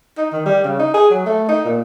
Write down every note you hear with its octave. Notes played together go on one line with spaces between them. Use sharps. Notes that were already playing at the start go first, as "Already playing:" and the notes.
D#4
D#3
G3
C#3
D#4
G#4
F#3
A3
D#4
A#2